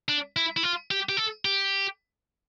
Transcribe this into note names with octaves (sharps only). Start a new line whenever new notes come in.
D4
E4
E4
F4
G4
G4
A4
G4